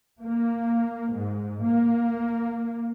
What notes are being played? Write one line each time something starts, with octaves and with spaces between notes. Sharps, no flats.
A#3
G#2
A#3